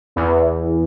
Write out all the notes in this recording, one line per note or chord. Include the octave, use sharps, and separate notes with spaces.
E2